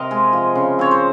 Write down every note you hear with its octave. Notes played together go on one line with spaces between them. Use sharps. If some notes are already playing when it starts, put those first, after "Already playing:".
Already playing: C3 A#4 D#5 F5
G#3
F3
C#3
C4 C#5
C5